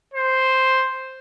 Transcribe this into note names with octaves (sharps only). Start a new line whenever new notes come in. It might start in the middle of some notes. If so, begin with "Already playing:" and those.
C5